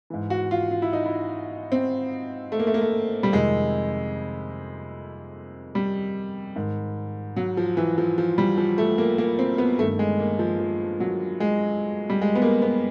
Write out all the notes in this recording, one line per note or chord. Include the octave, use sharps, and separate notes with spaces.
G#2 E3
F#4
F4
F4
E4
D#4
E4
C4
A3
A#3
A3
A#3
A3
G3
F2 C3 D#3 G#3
G3
G#2 D#3
F#3
F3
E3
F3
F3
G3
F3
A3
A#3
A#3
C4
B3
G2 D#3 A3
G#3
A#3
F3
F3
F#3
G#3
G3
G#3
B3
A#3
B3